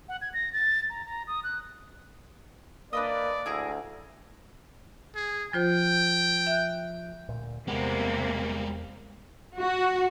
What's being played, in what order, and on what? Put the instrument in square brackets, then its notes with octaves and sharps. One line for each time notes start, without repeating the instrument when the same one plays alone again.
[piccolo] F#5
G#6
A#6
A6
A#5
A#5
D#6
F#6
[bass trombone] A#3 [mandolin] D4 B4 D#5 [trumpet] D5
[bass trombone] D2 [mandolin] E4 G#4 A#5
[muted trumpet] G#4
[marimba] F3 F4 C5 [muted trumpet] G5
[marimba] E5 F#6
[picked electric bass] D2 A#2
[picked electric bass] E2 B3 [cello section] C3 A#3 [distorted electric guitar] G3 G#3
[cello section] F#4